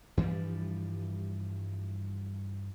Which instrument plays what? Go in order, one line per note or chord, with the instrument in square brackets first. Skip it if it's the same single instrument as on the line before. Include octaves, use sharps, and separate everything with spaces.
[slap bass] G2 E3 F3 G3